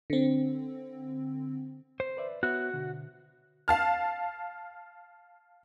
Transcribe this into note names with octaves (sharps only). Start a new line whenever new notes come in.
D3 C4
C5
B4 D5 E5
B3 F#4 C#5 E5
B2 D3
F5 A5 F6